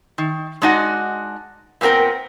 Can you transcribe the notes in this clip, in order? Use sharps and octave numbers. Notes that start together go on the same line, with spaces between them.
D#3
G#3 D4 D#4 F#4 F#5
A#2 B3 C4 A#4 G5